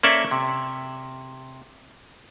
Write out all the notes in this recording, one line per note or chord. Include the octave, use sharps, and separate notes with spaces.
A#3 C#4 A4 C5 D5 E5
C3